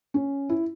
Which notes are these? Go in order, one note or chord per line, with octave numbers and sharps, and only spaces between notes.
C#4
E4